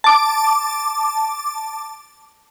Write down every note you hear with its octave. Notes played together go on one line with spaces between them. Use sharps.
A5 D6